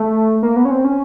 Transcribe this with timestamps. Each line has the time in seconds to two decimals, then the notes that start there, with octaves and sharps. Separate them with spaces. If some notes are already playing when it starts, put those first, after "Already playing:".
Already playing: A3
0.43 A#3
0.56 B3
0.65 C#4
0.71 C4
0.84 C#4